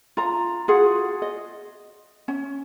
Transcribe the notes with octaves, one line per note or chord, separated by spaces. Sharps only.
F4 A#5
F4 F#4 G#4 F#5
D#5
C#4